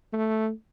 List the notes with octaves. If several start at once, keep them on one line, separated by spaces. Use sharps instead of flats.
A3